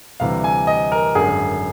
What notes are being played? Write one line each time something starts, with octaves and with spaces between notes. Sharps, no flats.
D2 C3 E3 G3 F5
G#5
D#5
A#4
G#1 F#2 D3 G#4